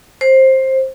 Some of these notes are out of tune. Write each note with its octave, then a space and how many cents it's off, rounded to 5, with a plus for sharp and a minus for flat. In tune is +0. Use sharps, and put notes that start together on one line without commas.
C5 +15